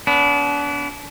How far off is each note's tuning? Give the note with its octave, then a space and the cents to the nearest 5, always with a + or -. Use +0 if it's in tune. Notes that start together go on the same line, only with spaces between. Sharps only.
B3 +0 D4 -35